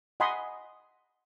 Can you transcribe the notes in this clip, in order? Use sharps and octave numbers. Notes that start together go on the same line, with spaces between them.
D#5 F#5 G#5 B5 C6 D#6